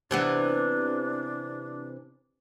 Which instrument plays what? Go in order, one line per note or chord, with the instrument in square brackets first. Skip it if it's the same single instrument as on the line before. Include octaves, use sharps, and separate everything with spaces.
[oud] C3 E3 B3 [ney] D4